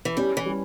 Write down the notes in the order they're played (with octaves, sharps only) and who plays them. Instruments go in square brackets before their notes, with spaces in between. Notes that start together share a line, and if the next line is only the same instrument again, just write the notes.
[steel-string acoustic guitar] E3
[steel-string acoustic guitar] G3 [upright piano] C#4
[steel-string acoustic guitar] E3
[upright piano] G3